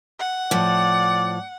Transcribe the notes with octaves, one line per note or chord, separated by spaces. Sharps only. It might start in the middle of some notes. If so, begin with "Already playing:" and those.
F#5
A2 F3 D5